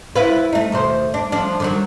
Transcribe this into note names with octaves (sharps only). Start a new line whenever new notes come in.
E4 F4 B4
A3 D#4
D#2 B2 C5
D4
F3 D4
D3 D#3 F#3